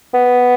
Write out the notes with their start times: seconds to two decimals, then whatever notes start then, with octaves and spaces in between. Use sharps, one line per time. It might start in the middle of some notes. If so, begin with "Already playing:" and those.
0.14 B3